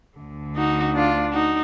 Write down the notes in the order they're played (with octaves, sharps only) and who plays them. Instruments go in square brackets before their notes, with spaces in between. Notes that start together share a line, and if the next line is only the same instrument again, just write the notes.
[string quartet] D2 D3
D#4 F#4
D4 F4
D#4 F#4